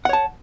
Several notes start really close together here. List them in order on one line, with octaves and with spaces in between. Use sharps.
F#5 C#5 A5